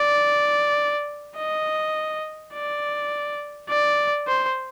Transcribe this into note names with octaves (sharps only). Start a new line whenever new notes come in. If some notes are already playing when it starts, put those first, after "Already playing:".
Already playing: D5
D#5
D5
D5
C5